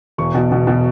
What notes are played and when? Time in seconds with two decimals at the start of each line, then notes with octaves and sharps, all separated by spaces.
0.18 E1 C#6
0.34 B2
0.52 B2
0.67 B2